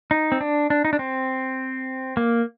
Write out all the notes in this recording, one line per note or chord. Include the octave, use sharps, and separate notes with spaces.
D#4
C4
D4
D4
D#4
D4
C4
A#3